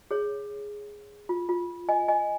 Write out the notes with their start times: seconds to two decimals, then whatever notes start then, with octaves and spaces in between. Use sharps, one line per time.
0.11 G#4 C#5
1.29 F4
1.49 F4
1.89 D#5 G#5
2.08 D#5 G#5